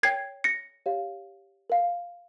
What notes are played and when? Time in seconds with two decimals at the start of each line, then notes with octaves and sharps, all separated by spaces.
0.03 A#4 C#5 G5 G#6 C7
0.44 A#6 C#7
0.86 G4 C#5 F5
1.70 A#4 F5